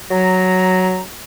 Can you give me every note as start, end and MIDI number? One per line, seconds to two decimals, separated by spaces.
0.11 1.01 54
0.11 1.01 82